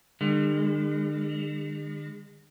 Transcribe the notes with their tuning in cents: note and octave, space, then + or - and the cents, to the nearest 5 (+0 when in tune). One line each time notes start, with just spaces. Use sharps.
D3 +45 G#3 -45